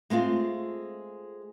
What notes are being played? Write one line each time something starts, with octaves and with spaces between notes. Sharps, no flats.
G#3 A3 C4 F4